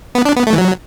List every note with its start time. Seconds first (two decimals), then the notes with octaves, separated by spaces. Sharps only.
0.15 B3
0.25 D4
0.36 B3
0.47 A3
0.53 E3
0.58 F#3